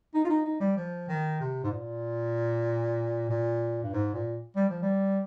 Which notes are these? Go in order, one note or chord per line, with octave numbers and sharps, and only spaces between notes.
D#4
F4
D#4
D#4
G3
F3
D#3
C3
G#2
A#2
A#2
G2
G#2
A#2
G3
F3
G3